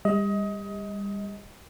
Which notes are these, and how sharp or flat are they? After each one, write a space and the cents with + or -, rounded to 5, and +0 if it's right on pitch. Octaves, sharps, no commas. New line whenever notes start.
G3 +35 D#5 +25